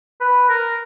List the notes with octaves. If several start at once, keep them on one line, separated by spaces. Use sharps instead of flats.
B4
A#4